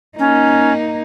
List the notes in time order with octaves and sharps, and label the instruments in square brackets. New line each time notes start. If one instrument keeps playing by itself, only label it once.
[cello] A#3 D#4 [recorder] C#4